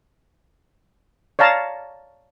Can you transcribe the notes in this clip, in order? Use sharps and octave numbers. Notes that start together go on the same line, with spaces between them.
C#5 D5 F5 A5 A#5